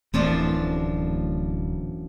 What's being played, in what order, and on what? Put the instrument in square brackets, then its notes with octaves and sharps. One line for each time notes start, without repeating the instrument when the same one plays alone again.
[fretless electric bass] D1 A3 C4 [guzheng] F#2 F3 D4 [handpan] E3